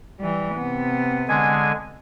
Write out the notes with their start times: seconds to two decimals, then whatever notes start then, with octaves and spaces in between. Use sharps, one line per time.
0.20 E3 G3
0.55 C3 B3
1.28 D3 G#3 G#5